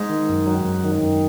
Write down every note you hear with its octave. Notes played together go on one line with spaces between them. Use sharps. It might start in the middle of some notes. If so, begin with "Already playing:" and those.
Already playing: G#2
D#3
F#2
F#3
F#2
D#3
F#2